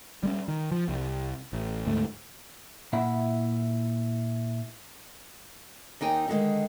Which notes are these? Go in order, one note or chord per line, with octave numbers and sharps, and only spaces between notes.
G3 G#3 C#4
D#3
F3
C2
A1
D2 G#2 A3
A#2 E4 E5 F#5 B5
D#2 D#4 G5 G#5
D3 D#3 F3 G#3